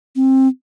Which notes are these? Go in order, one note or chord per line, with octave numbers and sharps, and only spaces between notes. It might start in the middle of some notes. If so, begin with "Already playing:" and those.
C4